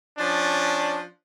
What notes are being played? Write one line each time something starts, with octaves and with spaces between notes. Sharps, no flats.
F3 C#4 D4